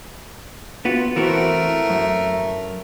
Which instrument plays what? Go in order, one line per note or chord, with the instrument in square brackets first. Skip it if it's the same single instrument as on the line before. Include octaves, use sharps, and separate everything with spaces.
[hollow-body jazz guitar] B3 F4 F#4
[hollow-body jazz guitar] E3 C4 F#4 [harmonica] A3 A#4
[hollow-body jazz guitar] F#2